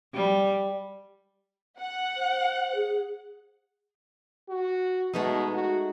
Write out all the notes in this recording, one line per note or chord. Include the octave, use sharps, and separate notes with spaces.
G3
F#5
C5
G#4
F#4
B2 G#3 A3 D#4
F#4